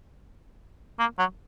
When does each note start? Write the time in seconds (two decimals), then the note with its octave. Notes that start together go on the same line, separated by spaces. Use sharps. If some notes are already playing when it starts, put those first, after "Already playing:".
0.99 A#3
1.18 F#3